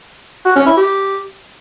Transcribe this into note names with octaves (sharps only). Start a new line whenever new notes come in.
F#4
C#4
E4
G4